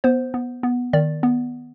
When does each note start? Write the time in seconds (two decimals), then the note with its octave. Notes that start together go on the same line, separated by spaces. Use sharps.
0.04 B3 C5
0.34 B3
0.63 B3
0.93 D#3 D5
1.23 B3